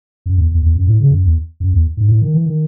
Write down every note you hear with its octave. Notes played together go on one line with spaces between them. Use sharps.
F#2
E2
E2
E2
F#2
A2
C#3
F#2
E2
F#2
E2
G#2
A2
D#3
E3
D#3